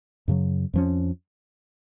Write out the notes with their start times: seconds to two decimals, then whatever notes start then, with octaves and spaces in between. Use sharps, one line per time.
0.28 F#2 C#3 F#3
0.74 F2 F3 A#3 C#4